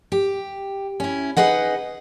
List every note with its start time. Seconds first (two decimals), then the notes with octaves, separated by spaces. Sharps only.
0.12 G4
1.00 C#4 E4
1.37 D#4 G#4 B4 D#5 F#5